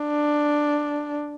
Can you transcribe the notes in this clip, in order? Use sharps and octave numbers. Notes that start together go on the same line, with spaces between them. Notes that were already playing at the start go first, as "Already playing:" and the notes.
Already playing: D4